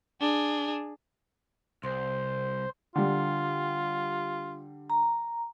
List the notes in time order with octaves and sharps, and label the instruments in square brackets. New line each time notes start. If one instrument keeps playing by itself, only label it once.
[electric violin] D4 G#4
[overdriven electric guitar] C2 [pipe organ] C5
[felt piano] D3 G3 [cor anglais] F4
[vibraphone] A#5